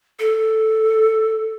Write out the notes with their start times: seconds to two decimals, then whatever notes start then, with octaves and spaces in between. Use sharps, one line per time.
0.19 A4